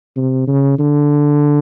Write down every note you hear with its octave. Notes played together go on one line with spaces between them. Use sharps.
C3
C#3
D3